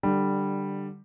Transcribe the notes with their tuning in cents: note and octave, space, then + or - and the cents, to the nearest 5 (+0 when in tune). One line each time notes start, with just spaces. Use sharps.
D3 +15 G3 +0